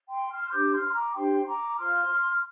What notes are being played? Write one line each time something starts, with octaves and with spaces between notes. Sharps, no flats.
G5 C6
C6 F6
F6
D4 G4 C5 D6 G6
C6 F6
C6
A#5 D6
D4 G4 C5 G5 C6
A#5 D6
F4 C5 C6 F6